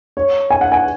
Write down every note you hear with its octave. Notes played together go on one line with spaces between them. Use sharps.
C#5
G#5
F#5
G#5